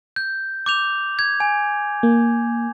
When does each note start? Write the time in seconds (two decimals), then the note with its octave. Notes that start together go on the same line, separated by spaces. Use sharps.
0.16 G6
0.66 D6 G6 F7
1.19 G#6
1.40 G#5
2.03 A#3